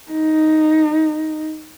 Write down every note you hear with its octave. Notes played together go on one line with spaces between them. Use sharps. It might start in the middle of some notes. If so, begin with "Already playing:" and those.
D#4